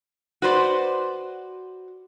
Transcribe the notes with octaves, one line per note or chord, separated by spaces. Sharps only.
F#4 B4 C5 D5